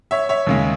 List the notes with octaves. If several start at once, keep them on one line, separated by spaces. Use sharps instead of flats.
C#5 E5
C#5 E5
D#2 C#3 G#3